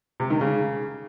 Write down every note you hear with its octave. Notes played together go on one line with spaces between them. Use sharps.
C3
D#3
C#3